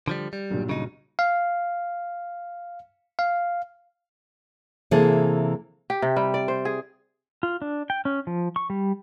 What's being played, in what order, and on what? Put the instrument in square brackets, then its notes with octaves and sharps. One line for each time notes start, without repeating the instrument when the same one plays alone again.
[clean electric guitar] D3 F3 G3
G3
[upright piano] B1 G2 A#2
[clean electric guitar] C#3 D#4
[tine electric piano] F5
F5
[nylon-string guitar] C3 E3 A#3 G#4 A4
[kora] G4
C3
G3
D5
C5
G#4
[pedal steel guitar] F4
D4
G5
C#4
F3
C#6
G3